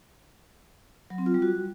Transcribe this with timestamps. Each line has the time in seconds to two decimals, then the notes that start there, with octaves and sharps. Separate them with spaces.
1.10 F#3
1.18 C4
1.26 F4
1.34 G3
1.42 F#4